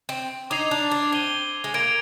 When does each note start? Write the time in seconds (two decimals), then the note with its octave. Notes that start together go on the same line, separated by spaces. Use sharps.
0.09 C4
0.50 D#4 D6 G#6 C7 F7
0.71 D4
0.91 D4
1.12 C4 G#6 D#7 G7
1.64 G#3
1.74 A#3 G#6 D7 F7